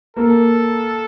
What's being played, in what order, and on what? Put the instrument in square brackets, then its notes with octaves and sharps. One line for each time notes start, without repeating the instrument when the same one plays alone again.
[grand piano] A#3 [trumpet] A4